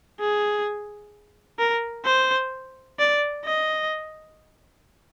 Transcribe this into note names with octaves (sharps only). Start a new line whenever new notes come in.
G#4
A#4
C5
D5
D#5